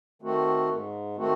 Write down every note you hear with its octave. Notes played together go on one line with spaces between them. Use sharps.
D#3 A3 C4 F#4
G#2
D#3 A3 C4 F#4